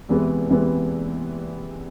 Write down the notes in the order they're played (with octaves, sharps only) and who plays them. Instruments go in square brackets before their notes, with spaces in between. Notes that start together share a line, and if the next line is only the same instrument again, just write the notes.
[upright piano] E2 C3 E3 G#3 B3
E2 C3 E3 G#3 B3